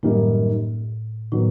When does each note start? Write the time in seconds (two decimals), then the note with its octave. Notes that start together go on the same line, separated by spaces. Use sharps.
0.03 F#2 A2 D#3 G3 A#3 D#4
1.32 A2 D#3 F#3 B3